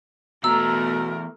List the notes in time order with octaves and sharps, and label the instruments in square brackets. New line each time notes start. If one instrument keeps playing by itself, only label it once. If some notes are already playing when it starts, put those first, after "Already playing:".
[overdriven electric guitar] E2 A#5 [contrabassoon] B2 [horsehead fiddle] A3 A#4 [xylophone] E6